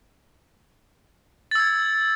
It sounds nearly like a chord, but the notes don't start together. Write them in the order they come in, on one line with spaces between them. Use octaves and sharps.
A6 E6 G#6